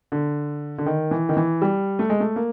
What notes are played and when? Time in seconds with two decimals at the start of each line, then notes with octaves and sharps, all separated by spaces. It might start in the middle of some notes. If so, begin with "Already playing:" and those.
0.12 D3
0.78 D3
0.86 D#3
1.11 E3
1.29 D#3
1.37 E3
1.62 G3
1.99 A3
2.10 G#3
2.20 A3
2.36 A#3